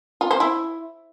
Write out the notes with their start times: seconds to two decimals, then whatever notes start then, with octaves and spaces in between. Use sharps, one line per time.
0.21 F4
0.31 C5
0.40 E4